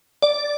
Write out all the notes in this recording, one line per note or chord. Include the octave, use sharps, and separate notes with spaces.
D5